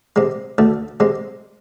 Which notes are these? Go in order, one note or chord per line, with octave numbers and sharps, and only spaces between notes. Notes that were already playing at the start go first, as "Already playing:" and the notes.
C3 G#3
D2 A3
C3 G#3